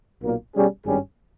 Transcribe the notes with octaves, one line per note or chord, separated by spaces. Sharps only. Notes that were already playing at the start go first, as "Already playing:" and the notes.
B1 A#2 A#3
B2 G3 C#4 G#4
G#1 G2 G3 C#4 G#4